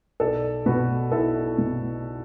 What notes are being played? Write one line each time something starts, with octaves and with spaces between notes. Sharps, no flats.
B1 A4 D5
B2 F#4 B4
B1 E4 A4
B2